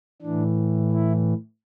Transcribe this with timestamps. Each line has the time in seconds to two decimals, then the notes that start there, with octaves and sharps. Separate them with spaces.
0.22 A2 E3 D4
0.91 E4